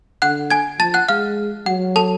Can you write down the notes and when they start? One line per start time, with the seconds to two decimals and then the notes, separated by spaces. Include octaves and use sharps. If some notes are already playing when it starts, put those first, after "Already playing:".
0.22 D3 F#5 F#6
0.50 G#5 G#6
0.79 F3 A5 A6
0.94 F#5 F#6
1.09 G#3 F5 F6
1.66 F#3 F#5
1.96 A4 A5